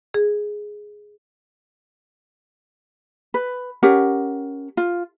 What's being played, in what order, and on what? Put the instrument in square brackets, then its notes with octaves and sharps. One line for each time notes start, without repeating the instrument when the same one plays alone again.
[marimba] G#4
[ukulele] B4
C#4 G4 A#4 F#5
F4